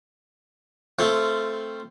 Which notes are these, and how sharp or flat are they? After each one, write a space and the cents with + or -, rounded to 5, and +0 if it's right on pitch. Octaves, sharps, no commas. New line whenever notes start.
A3 +0 C4 +0 F4 -20